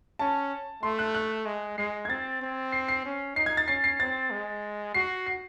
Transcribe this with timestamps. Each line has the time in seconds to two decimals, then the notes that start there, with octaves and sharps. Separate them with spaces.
0.19 C#4 A5
0.83 A3 C6
0.99 F#6
1.14 F#6
1.46 G#3
1.78 G#3 C7
2.05 G#6
2.09 C4 A6
2.42 C4
2.72 C7
2.88 C7
3.05 C#4
3.36 D#4 C7
3.46 G#6
3.57 A6
3.67 C#4 C7
3.84 C7
4.00 C4 A6
4.31 G#3
4.94 F#4 C7
5.26 C7